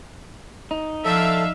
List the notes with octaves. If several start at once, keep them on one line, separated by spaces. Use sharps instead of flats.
D#4
F3 D4 A4 E5 F5